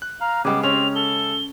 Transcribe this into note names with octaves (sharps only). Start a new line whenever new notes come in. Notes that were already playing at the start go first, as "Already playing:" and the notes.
F#6
F5 A#5
C#3 G3 G#3 B3 G#4 D#5 D6
C4 C#4 F7
A4 G7